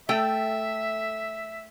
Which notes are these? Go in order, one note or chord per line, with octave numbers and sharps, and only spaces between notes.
A3 A4 E5 G5